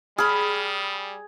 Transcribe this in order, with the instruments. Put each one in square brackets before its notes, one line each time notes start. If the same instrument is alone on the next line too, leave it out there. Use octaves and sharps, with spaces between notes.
[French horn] G3 [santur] G#4 [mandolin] B5 F6